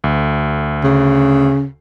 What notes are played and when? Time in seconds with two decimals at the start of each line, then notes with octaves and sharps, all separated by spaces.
0.04 D2
0.84 C#3